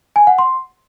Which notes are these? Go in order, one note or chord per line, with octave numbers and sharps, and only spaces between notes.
G#5
F#5
C6